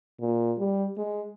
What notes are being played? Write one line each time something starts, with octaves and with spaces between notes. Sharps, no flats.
A#2
G3
G#3